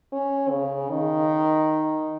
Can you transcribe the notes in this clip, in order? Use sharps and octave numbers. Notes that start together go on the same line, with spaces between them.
C#4
C#3
D#3